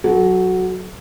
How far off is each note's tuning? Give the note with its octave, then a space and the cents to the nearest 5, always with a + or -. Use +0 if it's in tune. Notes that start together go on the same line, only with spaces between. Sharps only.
F#3 +0 A4 -35